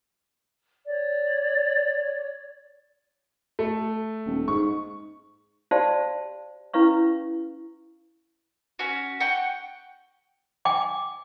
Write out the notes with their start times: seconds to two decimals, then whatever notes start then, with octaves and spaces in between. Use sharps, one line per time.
0.87 C#5 D5
3.59 A3
4.26 D#1
4.48 G#2 C#6
5.71 F#4 G4 C5 D5 F5 A5
6.74 C#4 E4 B4 F5 C#6
8.79 C#4 F#4
9.20 F#5 G5 C#6
10.65 G5 G#5 D6